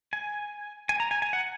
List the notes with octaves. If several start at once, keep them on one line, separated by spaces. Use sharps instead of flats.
G#5
G#5
A#5
G#5
G#5
F#5